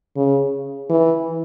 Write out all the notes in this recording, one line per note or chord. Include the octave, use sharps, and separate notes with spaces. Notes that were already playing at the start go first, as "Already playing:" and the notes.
C#3
E3